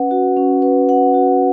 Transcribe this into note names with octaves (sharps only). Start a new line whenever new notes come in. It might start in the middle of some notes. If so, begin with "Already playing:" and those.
Already playing: C#4 B4 F#5
F#4
C#4
B4
F#5
F#4